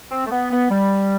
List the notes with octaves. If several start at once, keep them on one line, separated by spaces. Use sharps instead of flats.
C4
A3
B3
B3
G3